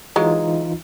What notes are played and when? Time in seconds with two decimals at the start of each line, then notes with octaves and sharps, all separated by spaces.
0.16 E3 F#3 G#3 D#4 F4